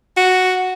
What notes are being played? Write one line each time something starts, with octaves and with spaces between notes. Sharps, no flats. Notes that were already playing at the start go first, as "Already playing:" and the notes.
F#4